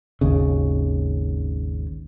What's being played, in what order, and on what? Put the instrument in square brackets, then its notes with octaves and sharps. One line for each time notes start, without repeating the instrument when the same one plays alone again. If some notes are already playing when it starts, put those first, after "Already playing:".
[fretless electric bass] G#1 D#2 C#3